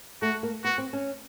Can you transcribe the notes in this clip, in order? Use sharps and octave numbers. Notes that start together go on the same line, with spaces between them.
A3 F#4
A#3
B3 F#4
C4
C#4